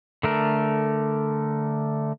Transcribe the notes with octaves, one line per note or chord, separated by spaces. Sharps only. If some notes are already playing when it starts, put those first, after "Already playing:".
D3 A3 A#4